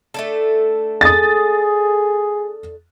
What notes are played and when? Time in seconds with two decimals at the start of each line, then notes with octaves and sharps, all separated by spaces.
0.14 A3 D4 A4
1.01 G#4 D#6 A6